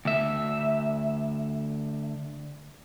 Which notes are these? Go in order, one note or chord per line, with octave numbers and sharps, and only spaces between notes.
D2 E5